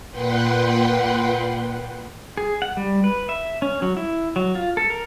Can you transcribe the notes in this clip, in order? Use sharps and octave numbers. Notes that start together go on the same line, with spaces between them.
A#2 B4 F#5 G5 C6
G#4
F#5
G3
B4
E5
C#4
F#3
E4
F#3
F4
A4
A#4